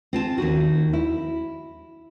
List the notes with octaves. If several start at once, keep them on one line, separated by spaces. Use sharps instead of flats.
C4 F4 A5
D#2 D#4 F#4
E4